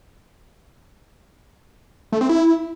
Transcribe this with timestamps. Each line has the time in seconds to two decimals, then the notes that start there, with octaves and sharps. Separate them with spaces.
2.12 A3
2.21 C4
2.29 E4